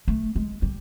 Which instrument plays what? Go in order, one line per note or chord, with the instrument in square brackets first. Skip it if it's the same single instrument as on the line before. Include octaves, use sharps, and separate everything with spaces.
[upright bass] A3
G#3
G3